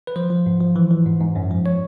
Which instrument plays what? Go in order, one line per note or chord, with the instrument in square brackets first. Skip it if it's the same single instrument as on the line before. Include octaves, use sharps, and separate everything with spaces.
[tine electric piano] B4
F3 C5
F3
G#2
F3
E3
E3
G#2
G#2
F#2
F3
C#5